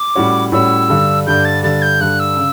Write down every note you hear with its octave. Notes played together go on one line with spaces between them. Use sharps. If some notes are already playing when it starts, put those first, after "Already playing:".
Already playing: D6
A2 G3 C#4 F#4 C#5
A2 G3 C#4 F#4 C#5 E6
G2 D3 G3
G2 D3 G3 G6
A6
G2 D3 G3 A6
G6
G2 D3 G3 F#6
E6
C#3